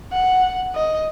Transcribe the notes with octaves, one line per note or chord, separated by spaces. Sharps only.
F#5
D#5